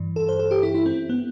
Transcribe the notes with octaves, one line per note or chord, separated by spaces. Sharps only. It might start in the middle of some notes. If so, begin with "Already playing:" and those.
Already playing: G2 E3
A4
C5
A4
G4
E4
E4
C4
B3